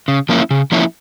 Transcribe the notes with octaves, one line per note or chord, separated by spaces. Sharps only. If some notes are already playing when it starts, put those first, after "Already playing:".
C#3
F3 A#3 C#4 E4
C#3
F3 A#3 C#4 E4